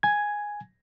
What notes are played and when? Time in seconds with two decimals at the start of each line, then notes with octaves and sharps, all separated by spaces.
0.03 G#5 G#6